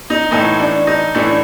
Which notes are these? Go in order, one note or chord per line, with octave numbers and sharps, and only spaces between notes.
D#4
A2 E3 A3 D#4
D4
D#4
A2 E3 A3 D4